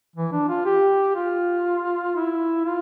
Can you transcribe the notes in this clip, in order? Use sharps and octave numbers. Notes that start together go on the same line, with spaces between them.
E3
D4
F4
G4
F4
E4
F4